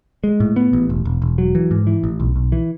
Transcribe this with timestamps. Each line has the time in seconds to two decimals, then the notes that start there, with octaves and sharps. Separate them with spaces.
0.24 G#3
0.40 A2
0.56 B3
0.73 A1
0.90 E1
1.05 E1
1.22 E1
1.38 F#3
1.55 E3
1.71 G#2
1.87 E3
2.04 A1
2.20 B1
2.36 B1
2.52 E3